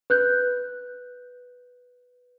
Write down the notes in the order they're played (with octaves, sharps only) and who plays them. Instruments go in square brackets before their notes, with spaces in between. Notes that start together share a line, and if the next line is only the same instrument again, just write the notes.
[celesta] B4 F#6 G6